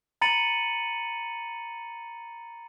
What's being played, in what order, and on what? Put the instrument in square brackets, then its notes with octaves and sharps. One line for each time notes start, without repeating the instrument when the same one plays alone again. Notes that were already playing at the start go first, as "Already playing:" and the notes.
[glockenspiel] A#5 B5 A6 C#7 D#7 F#7